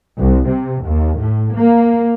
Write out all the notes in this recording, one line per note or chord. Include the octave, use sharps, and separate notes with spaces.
C2
C3
D#2
A2
A#3